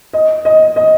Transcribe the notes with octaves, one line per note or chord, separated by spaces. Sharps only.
D#5
D#5
D#5